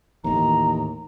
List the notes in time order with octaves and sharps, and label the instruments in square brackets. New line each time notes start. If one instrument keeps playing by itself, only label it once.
[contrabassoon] D#2 [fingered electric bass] A2 E3 [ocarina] A#5